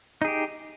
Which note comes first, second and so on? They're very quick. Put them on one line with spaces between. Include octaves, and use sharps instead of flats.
D#4 G#4 G4